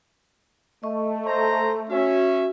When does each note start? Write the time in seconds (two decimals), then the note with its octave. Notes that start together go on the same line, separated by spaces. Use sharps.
0.83 A3 D#5 E5 C#6
1.26 C5 A#5
1.90 C#4 F#4 E5